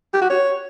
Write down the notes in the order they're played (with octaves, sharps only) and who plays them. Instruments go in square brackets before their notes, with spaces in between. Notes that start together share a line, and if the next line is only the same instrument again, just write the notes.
[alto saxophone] G4
F#4
C#5